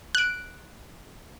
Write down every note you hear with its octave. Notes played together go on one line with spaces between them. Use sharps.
F#6 D7